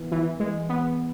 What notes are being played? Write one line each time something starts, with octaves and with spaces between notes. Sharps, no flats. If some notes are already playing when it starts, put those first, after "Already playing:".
Already playing: E3 B3
E3
G#3
B3